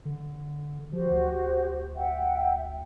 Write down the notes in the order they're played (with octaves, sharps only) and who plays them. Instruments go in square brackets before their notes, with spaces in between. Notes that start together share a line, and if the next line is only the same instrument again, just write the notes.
[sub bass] D3
[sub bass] F3 [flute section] F#4 G4 C5
[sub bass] D2
[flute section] E5 F#5 G5